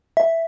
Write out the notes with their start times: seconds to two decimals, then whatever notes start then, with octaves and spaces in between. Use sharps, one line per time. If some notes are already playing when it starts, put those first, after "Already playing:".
0.17 E5